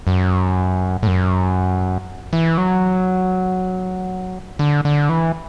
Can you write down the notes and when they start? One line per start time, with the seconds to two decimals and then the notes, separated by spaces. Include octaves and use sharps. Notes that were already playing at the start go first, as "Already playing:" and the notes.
0.07 F#2
1.03 A2
1.07 F#2
2.33 E3
2.58 F#3
4.59 D3
4.85 D3
5.09 E3